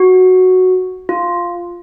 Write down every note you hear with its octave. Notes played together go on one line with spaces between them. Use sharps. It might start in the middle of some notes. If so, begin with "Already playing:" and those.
Already playing: F#4
F4